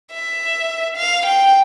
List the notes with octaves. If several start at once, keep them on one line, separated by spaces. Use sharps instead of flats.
E5
F5
G5